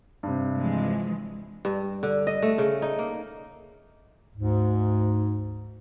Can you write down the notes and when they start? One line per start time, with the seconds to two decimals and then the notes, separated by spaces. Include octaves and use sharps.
0.23 G2 C3
0.58 E3 F3 G#3
1.65 G2
2.03 D3
2.27 D#5
2.42 A3
2.58 C#3
2.82 D#4
2.99 A#3
4.35 D2 G#2